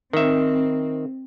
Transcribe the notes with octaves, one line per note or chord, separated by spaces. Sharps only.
D#3 C4 E5